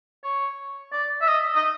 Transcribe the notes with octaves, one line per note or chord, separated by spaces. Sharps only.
C#5
D5
E5
D#5
D#5